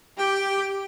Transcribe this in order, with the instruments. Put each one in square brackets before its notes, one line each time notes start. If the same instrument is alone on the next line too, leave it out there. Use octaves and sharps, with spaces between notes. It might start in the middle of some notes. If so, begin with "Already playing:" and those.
[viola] G4 [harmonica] G5